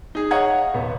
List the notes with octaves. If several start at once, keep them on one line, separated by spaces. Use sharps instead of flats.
D#4 G#4
C#5 D#5 F5 F#5 A#5 G#6
D#1 B3